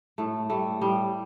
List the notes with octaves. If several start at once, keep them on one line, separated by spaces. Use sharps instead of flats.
A2 A3
G3 A3
A2 G3